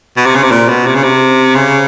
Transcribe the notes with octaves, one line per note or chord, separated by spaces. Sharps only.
B2
C3
C#3
C3
A#2
B2
C3
C#3
C3
C#3